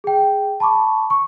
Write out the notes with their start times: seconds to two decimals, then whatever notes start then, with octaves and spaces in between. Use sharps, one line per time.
0.04 G#4 G5
0.60 A5 B5 C#6 D6
1.10 C#6